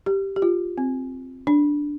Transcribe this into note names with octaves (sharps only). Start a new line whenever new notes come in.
G4
G4
F4
C4
D4